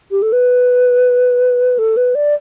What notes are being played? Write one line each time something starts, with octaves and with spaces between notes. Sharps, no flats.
G4
A4
B4
A4
B4
D5